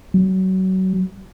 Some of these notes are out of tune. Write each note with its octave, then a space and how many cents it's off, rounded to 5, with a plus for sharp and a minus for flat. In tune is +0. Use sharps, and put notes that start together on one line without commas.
F#3 +25